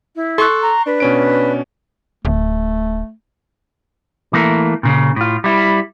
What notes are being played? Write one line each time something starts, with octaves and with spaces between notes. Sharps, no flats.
E4
A4 C6 C#6 F#6
A#5
D4 B4
B2 C#4 D7
D1 A3
E3 A3 A#3
A#2 C#3
A2 F4
G3 E4